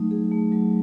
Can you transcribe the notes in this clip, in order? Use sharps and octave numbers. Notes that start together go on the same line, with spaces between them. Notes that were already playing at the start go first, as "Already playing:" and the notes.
Already playing: F#3 A3 D#4
G#4
A3
F#3